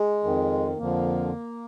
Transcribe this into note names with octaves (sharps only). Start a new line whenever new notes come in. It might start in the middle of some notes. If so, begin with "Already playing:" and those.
Already playing: G#3
F2 D#3
F2 D3 F3 A#3